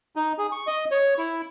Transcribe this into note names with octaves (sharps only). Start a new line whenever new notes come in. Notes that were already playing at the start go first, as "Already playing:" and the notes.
D#4
G#4
C#6
D#5
C#5
E4